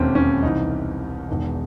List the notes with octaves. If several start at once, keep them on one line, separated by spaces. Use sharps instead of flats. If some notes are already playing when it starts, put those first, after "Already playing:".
Already playing: E1 D#2 D#3 C4 C#4
C#4
C2 C3 E3 D#4
E1 E2 D#3